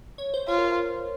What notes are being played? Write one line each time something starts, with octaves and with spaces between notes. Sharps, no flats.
C#5
C5
F4 C#5
A#4